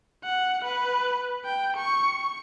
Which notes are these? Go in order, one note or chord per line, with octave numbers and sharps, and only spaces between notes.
F#5
B4
G5
C#6